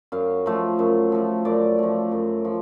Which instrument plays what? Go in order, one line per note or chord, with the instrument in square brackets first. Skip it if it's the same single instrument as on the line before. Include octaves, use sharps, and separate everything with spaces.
[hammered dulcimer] F#2 F5
F3 A3
F#2
F3 A3
F#2 D5
F3 A3
F#2
F3